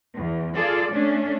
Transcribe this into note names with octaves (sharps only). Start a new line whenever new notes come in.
E2
F4 G#4 A4 D5
A3 C#4 D4